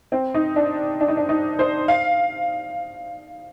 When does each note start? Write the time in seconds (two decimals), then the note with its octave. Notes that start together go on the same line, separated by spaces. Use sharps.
0.12 C4
0.34 D#4
0.56 D4
1.01 D4
1.08 D#4
1.17 D4
1.29 D#4
1.59 C5
1.88 F5